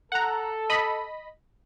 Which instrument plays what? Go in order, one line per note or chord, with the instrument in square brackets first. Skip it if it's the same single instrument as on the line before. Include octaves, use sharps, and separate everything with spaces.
[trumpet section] A4 [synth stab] F#5 A#5
[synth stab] D#5 B5